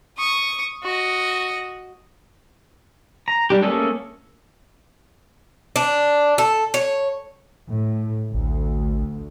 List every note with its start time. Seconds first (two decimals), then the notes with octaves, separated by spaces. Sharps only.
0.18 C#6 D#6
0.83 F#4 D#5
3.28 A#5
3.50 G3 D4 G4
3.63 A3 A#3 C#4 G#4 A4
5.76 D4
6.38 A4
6.74 C#5
7.69 A2
8.34 A1 D2